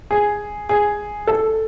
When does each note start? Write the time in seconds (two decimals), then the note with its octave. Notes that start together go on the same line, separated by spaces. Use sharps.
0.11 G#4
0.69 G#4
1.27 A4